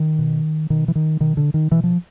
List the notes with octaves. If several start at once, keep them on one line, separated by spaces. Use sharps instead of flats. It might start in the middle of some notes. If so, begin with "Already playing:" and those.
Already playing: D#3
B2
B2 D#3
E3
D#3
B2 D#3
D3
D#3
B2 E3
F3